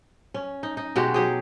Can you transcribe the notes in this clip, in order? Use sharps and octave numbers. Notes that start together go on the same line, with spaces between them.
C#4
D#4
D#4
B2 G#3 F#4 G4
F#3 G4 G#4